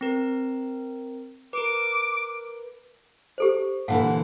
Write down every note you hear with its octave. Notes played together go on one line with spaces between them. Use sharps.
C4 A#4
A#4 B4 D6
G4 A4 C5
A#2 D3 E3 F5 F#5